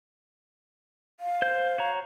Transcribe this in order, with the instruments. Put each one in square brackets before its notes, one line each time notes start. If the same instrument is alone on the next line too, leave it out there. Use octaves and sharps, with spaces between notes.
[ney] F5
[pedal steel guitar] C5 G6
F#4 C#5 A#5